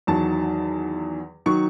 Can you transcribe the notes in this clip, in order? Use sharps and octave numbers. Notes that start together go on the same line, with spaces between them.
E2 D#3 F#3 A5
D#3 F#3 C#6